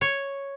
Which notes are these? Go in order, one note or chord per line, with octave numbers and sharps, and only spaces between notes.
C#5